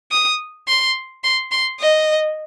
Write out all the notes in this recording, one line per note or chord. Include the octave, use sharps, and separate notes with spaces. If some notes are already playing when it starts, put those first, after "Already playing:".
D#6
C6
C6
C6
D#5